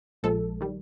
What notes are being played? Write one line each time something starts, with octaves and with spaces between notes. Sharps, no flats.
A#1 A#2 F3 G#3 A4
D#3 G3